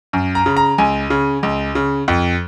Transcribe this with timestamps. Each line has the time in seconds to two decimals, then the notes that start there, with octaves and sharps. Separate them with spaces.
0.13 F#2
0.35 A#5
0.46 C#3
0.57 A#5
0.78 C#2 G#5
1.10 C#3
1.43 C#2
1.75 C#3
2.08 F2